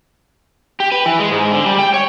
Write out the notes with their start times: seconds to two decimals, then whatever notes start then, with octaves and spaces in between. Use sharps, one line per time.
0.80 G4
0.92 B4
1.06 E3
1.19 G#3
1.31 G#2
1.52 D3
1.65 G3
1.79 G5
1.94 C#5